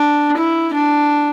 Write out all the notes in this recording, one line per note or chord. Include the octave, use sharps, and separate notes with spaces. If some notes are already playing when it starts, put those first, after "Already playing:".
Already playing: D4
E4
D4